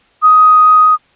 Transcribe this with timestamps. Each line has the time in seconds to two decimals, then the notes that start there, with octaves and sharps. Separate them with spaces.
0.22 D#6